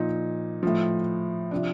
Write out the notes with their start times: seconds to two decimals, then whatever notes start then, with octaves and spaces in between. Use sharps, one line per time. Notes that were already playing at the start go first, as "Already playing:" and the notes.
Already playing: A#2 F3 D#4
0.63 A2 F3
1.51 C3 F3 D4